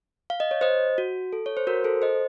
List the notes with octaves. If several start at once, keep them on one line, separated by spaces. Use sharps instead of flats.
F5
D#5
C#5
C5 D#5
F#4
A4
C#5
C5
F#4 A#4
A4 C5
C5 D#5